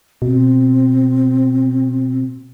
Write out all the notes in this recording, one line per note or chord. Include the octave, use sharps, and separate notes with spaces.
B2 C4